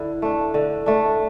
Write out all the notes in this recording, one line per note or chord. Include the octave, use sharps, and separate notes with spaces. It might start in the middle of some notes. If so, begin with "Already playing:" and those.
Already playing: D3 E4
A3 D4
D3
A3 D4